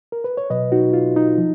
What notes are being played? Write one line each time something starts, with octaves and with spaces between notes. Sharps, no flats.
A#4
B4
C#5
B2 F#3 B4 D#5
D#4 F#4
F4
D#4
F3